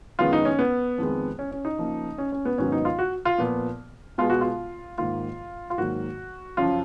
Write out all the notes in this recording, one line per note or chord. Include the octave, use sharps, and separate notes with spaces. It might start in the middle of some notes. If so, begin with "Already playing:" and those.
F#2 D#3 G#3 B3 F4
D#4
C#4
B3
F2 D#3 G#3 B3
C#4
C#4
D#4
C#3 F3 A#3
C#4
C#4
B3
G#2 D#3 F#3 B3 C#4
D#4
F4
F#4
F4
A#2 F3 B3
B2 G#3 B3 F4
F#4
F4
G#2 D#3 A#3 F4
F4
G#2 D#3 F#3 A#3 F#4
F#2 C#3 F3 F4